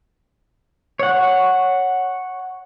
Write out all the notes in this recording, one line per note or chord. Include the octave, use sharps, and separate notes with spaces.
C#5 F#5